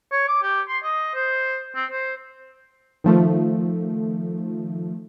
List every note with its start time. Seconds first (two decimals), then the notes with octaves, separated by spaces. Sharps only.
0.12 C#5
0.28 D6
0.43 G4
0.68 C6
0.83 D#5
1.15 C5
1.76 C4
1.91 C5
3.04 D#3 F3 A3